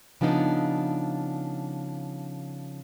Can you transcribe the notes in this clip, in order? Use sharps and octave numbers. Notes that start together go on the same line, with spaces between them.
C#3 F3 B3 D4 D#4